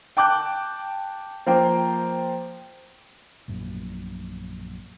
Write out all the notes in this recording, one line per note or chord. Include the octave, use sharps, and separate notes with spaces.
G5 A5 D6 F#6 G6
F3 A#3 C5 G5
A#1 F#2 A#2